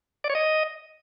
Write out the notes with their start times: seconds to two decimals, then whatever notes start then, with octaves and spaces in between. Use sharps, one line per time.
0.24 D5
0.30 C#5
0.35 D#5